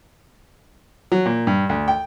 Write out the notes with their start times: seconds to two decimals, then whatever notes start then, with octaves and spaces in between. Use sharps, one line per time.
1.12 F#3
1.26 A#2
1.47 G2
1.69 D2
1.88 G5